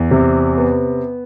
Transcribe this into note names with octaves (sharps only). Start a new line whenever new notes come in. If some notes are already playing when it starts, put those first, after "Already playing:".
Already playing: E2
C3
B3